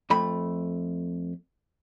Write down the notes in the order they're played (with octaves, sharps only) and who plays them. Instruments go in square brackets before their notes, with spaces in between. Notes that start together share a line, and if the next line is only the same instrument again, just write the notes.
[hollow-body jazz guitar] F2 A3 B5